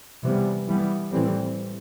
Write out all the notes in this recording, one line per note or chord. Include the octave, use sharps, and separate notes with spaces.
C3 E3 G3 B3
E3 G3 B3
A2 E3 G3 C4